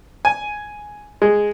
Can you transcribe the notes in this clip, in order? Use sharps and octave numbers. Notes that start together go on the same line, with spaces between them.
G#5
G#3